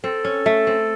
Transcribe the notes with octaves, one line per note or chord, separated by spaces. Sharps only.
C4 A4
C#4
A3
C4